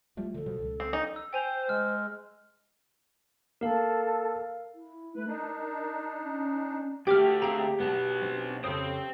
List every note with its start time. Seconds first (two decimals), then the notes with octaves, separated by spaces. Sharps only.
0.17 F3 G3 A3 F4
0.34 D3 F3 A4
0.46 B2 F3 G3
0.59 C#2
0.80 C4
0.93 D#4
1.16 E6
1.33 C5 G5 G#5 F7
1.69 G#3 F6
3.61 A#3 A4 A#4 F5
4.75 E4
5.16 A3 B4
5.28 D4 D#4 A#4
6.24 C#4
7.07 D2 A3 G4 G5 D6 F6
7.42 C4 G#4 F5 G5 A#5
7.80 B1 B3 F#5 A5
8.22 C4 D4
8.64 F2 C#3 A4 C5 G5 D#6